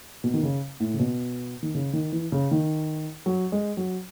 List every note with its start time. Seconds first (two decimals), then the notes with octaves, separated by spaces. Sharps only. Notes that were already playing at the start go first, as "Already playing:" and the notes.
0.24 B2
0.34 D#3
0.43 C#3
0.80 A2
0.94 C#3
1.00 B2
1.62 D#3
1.74 C#3
1.93 D#3
2.12 E3
2.32 C#3
2.51 D#3
3.26 F#3
3.52 G#3
3.77 F#3